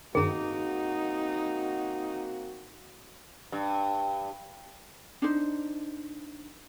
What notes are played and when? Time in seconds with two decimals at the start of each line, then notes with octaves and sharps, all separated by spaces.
0.15 G2 D#3 A#3 C4 D#4 F#4 G#4 A#5
3.52 G2
5.22 D4 D#4 C5